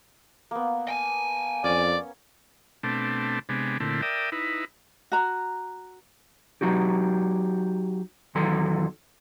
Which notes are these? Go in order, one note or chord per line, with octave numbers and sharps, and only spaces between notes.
A#3 B3
G5 G#5
F2 C#4 D5
B2 A3 C4 D4
C3 G#3 B3 D4
A#2 D3 A3 C4 E4
A#4 D5 E5 G5 D#6
D#4 E4 B4
F#4 A#5
F#3 D#4 F#4 G4
E2 D#3 F#3 A4 C6